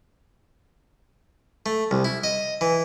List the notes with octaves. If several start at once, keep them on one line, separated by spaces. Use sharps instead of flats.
A3
C2
E4
D#5
E3